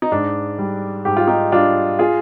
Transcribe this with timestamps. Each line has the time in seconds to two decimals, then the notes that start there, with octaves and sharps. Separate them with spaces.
0.02 D#4
0.12 G#2 D4
0.58 G3
1.05 G#2 G4
1.17 F4
1.27 D#4 G4
1.52 G3 D4 F4
1.99 F4 G#4